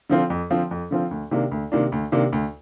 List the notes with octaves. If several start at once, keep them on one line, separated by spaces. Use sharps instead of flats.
D3 F3 C4 F4
F2
D3 F3 C4 F4
F2
D3 F3 C4 F4
D2
C3 D#3 A#3 D4
D2
C3 D#3 A#3 D4
D2
C3 D#3 A#3 D4
D2